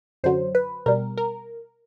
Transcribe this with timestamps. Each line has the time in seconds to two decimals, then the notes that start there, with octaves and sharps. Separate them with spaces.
0.24 F#2 D3 F#3 C5
0.55 B4
0.86 B2 G3 A#4
1.18 A#4